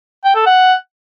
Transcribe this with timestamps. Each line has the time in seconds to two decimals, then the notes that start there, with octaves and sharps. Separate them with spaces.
0.24 G5
0.35 A4
0.46 F#5